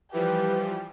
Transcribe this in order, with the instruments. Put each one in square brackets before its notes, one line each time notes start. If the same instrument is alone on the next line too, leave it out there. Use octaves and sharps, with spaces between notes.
[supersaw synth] E3 F3 G3 [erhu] G4 [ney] B4